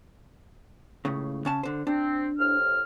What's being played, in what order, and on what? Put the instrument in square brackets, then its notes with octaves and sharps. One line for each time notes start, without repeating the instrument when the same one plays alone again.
[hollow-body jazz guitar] C#2 A2 C#3
C#3 C#4 A5
D3 C5
[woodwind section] C4 [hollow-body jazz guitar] D4
[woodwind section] C2 A2 F6